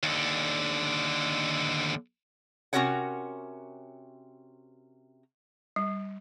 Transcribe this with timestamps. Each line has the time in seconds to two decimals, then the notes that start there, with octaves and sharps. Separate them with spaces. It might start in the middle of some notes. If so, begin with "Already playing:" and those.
0.03 D#2 D3
2.73 C3 C#4 F#4 A#4 C#5 F#5
5.76 G3